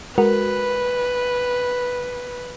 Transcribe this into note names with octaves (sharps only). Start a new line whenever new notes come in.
G#3 F#4 A#4 B4